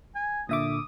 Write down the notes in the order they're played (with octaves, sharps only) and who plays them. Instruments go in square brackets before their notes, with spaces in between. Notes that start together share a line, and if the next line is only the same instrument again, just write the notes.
[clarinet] G#5
[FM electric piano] A#2 E5 D6 [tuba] D3 [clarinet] D#6